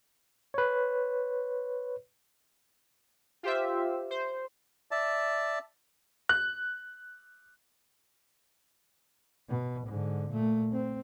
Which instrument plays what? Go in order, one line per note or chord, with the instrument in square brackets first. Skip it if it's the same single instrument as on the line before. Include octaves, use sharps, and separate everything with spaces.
[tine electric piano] B4 C#5
[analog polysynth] F4 G4 C5 E5
C5
[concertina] D5 E5 A5
[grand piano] F#6
[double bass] B2
G#2 D3
A#2 A3
C4